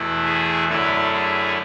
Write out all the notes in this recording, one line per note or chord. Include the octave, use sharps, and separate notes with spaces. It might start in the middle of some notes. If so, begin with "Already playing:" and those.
Already playing: E2 B2 A3 E4
G#4
F#2 D3 A3 E4 A4
G#4